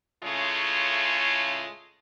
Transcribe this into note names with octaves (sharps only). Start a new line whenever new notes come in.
A2 C#3 G#3 A3 F4 C#5